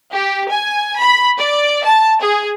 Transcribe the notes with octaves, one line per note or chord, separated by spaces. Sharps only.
G4
G#5
B5
D5
A5
G#4